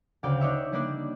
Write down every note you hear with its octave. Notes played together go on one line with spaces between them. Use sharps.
D2 C#3 D5 F5 G5
D4 D#4 C#5 D5 E5
G3 A#3 D4 D#4 D5